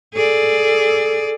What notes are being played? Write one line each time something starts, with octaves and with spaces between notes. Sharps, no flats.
G#4 A4 D5